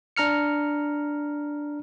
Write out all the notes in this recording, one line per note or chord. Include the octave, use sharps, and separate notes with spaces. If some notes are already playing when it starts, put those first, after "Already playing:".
D4 A#5 F6 C#7